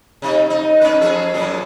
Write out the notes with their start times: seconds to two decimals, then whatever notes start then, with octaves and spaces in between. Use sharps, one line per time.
0.22 C3 D#4
0.50 D#4
0.81 C#4 D#4 B4
1.01 F3 G#4 A4
1.34 F#2 A#2 B3